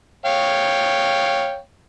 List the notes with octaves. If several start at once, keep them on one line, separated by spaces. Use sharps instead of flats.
C#5 F5 G5